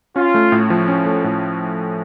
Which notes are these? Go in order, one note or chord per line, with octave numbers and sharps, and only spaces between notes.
C#4 F4
A3
A2
F3
C#4
A3
A2